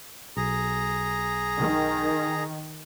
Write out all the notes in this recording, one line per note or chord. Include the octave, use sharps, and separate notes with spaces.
B1 G#4 A#5
D#3